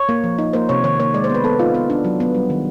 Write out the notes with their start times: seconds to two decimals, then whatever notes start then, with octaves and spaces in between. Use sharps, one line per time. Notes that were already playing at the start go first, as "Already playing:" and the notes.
Already playing: C#5
0.09 A#3
0.24 F3
0.39 D#4
0.53 A#3 C5
0.69 C3 C#5
0.84 D#3 C#5
1.00 A#3 C#5
1.14 G#3 D5
1.24 C5
1.30 B3 B4
1.44 B3 A4
1.59 D#4 F4
1.74 B3
1.90 D4
2.04 F#3
2.20 B3
2.35 G3
2.50 D#3